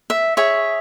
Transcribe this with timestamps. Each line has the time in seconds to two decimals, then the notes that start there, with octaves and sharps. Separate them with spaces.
0.10 E5
0.37 G#4 C#5 E5